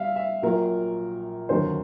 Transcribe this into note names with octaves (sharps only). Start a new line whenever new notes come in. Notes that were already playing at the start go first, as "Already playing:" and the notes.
Already playing: G3 E5 F5
E5
A#1 A#2 F#3 A#4
F1 D#2 D3 F#3 C5